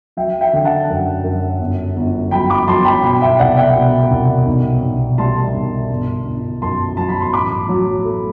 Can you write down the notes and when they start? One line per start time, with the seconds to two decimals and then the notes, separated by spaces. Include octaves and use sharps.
0.17 F#3 E5 G5
0.41 E5 G5
0.53 D3
0.65 F#5 A5
0.89 F#2
1.24 F#2
1.60 G1
1.97 G1
2.31 F#3 G5 B5
2.50 B5 D6
2.67 F#3 A5 C6
2.85 G5 B5
3.03 B2 G5 B5
3.21 E5 G5
3.39 C2 D5 F#5
3.57 E5 G5
3.76 B2
4.11 C2
4.46 B1
4.82 B1
5.18 G3 A5 C6
5.54 B1
5.90 G1
6.26 G1
6.62 F#2 A5 C6
6.97 F#3 A5
7.09 B5
7.21 C6
7.33 A1 B5 D6
7.69 F#3
8.04 A3